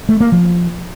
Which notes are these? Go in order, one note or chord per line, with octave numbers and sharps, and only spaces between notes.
A3
A#3
F3